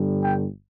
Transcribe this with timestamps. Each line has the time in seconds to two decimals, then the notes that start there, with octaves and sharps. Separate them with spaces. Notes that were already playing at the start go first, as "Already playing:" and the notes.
Already playing: G1 G2 D3 G3
0.24 G5